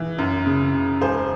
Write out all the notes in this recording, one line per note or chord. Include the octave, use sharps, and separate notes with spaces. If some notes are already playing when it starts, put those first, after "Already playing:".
Already playing: E3
F#2
C#3
C#3
E1 G#4 C5